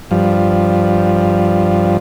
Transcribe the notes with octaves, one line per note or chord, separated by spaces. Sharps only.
G2 F3